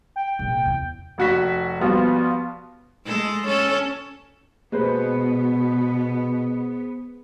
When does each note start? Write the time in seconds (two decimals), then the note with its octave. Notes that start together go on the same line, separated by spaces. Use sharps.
0.16 G5
0.39 A#1 C3
0.66 E2
1.18 F1 F#4 B6
1.80 F3 G3 B3 F4 F#4
3.05 G#3 A4
3.47 C#4 A4
4.72 B2 G#3 B3 B4 C5